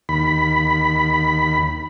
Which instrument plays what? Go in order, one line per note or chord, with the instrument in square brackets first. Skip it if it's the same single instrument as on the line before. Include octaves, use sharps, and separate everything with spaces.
[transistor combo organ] D#2 B5